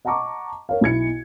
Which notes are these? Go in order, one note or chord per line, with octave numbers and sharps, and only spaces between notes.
D#5 F#5 A5 A#5 C#6 D6
A#4 C#5 F5
B1 E4 G#6 C#7